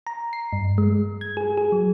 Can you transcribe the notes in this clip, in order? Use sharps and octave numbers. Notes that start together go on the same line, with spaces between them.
A#5
C7
G2
G#3
G#6
G#4
G#4
F#3